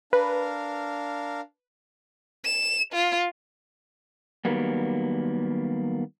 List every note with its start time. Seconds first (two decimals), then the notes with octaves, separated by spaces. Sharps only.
0.13 D4 A#4 B4 F5
2.45 E7
2.93 F4
4.45 D#3 F#3 G3 A#3 B3